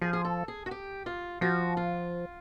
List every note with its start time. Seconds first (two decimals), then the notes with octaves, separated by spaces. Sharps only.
0.02 F3 G#4
0.13 G#4
0.25 A4
0.48 G#4
0.66 F#4
0.71 G4
1.06 F4
1.41 F3 F#4
1.77 F4